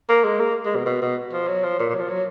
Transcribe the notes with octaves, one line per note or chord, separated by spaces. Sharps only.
A#3
G#3
A#3
G#3
B2
B2
B2
F3
F#3
F3
A#2
A#2
F#3
F3
F#3